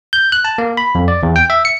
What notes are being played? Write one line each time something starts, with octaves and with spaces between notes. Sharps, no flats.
G6
F#6
A5
A#3
B5
F2
D5
E2
G5
E5
C#7